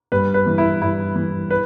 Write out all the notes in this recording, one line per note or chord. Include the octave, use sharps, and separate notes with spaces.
G2 B4
B4
E3
E4
G2 E4
E3
B4